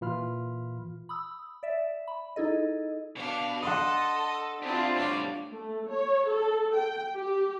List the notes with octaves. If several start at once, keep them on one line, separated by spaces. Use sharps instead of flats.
A#2 E3 F4 B5 F6
B5 D#6 E6
D5 E5
B5
D#4 E4 G#4 A4 D#5
B2 D4 F5
A4 D#5 F#5 C6 D#6
C4 D4 E4 F4 G4 G#4
A2 G3 C#5 D5
A3
C#5
A4
G5
G4